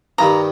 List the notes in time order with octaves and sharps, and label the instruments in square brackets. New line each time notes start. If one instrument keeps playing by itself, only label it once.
[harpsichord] G2 D#3 G3 [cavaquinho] A#5